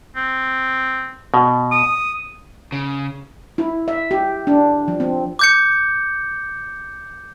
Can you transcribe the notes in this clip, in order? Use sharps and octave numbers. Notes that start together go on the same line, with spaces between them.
C4
B2
D#6
C#3
E4
E5
G4
D4
F3
C4
D6 G6 C#7